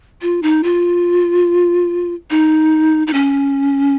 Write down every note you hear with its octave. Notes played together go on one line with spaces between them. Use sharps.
F4
D#4
F4
D#4
D#4
C#4